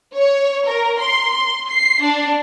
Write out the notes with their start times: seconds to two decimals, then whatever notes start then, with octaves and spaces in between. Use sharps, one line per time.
0.15 C#5
0.66 A#4
0.99 C6
1.33 C6
1.69 C7
2.02 D4